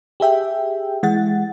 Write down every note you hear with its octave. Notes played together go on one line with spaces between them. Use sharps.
G4 G#4 E5 G5
E3 G#3 F#5 A6